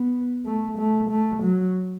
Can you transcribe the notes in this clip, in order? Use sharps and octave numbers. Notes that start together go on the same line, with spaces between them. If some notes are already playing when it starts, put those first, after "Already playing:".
Already playing: B3
A3
A3
A3
F#3